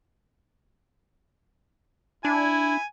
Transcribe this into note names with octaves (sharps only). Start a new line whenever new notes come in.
D4 E4 G#5